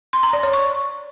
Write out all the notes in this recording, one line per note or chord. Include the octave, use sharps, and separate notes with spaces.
C6
A#5
D5
C#5
C#6